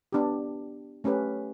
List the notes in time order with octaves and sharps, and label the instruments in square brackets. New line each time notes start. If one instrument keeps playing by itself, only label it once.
[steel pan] B3 D4 G4
A3 C#4 G4 B4